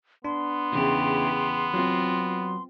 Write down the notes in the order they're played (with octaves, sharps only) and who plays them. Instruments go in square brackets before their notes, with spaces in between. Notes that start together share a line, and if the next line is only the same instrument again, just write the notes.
[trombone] B3 [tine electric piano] D4 [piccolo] C6
[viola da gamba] E2 C#3 G4
[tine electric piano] F#3 [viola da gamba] C4 F4